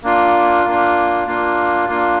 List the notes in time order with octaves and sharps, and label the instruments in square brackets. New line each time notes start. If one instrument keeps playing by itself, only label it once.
[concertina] A#3 D4 F4
A#3 D4 F4
A#3 D4 F4
A#3 D4 F4